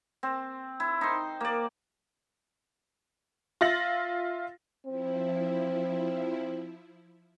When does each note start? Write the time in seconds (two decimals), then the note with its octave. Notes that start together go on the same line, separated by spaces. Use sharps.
0.23 C4
0.80 E4
1.01 D#4 C5
1.41 A#3 D5
3.61 F4 E5 A6 A#6 F#7
4.86 F3 C4 E4